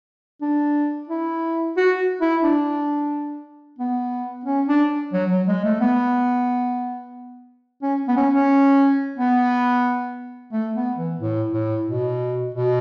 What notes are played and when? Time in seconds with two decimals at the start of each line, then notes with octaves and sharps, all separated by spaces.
0.42 D4
1.09 E4
1.77 F#4
2.21 E4
2.43 D4
3.79 B3
4.45 C#4
4.68 D4
5.13 F#3
5.30 F#3
5.47 G#3
5.64 A3
5.81 B3
7.82 C#4
8.08 B3
8.17 C#4
8.34 C#4
9.18 B3
10.52 A3
10.75 B3
10.97 E3
11.19 A2
11.53 A2
11.86 B2
12.54 B2